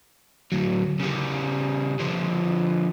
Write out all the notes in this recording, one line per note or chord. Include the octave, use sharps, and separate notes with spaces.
D2 F#3
C#3 G3
D3 F3